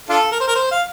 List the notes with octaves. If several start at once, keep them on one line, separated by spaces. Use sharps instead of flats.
D4 F4 A4
A#4
C5
A#4
C5
F5